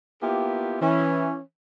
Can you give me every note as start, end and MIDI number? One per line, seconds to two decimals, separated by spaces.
0.22 0.76 58
0.22 0.76 59
0.22 0.76 64
0.22 0.76 65
0.22 0.76 67
0.81 1.39 52
0.81 1.39 61